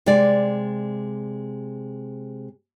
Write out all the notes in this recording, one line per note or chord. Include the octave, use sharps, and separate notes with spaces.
C3 G#3 D5